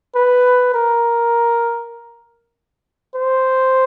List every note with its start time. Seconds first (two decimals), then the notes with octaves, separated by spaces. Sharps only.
0.15 B4
0.74 A#4
3.15 C5